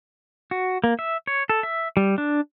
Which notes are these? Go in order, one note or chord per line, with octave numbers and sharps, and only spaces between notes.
F#4
A#3
E5
C#5
A4
E5
G3
D4